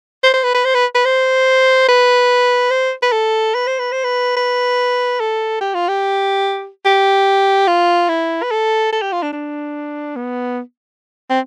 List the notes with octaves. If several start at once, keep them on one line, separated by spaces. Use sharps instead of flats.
C5
C5
B4
B4
C5
B4
B4
C5
B4
C5
B4
A4
B4
C5
B4
C5
B4
B4
A4
G4
F4
G4
G4
F4
E4
B4
A4
A4
G4
F4
D4
D4
B3
C4